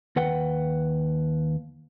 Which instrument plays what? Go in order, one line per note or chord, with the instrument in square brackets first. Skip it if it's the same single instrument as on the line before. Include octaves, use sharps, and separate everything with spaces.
[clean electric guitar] D#2 B4 F#5 G5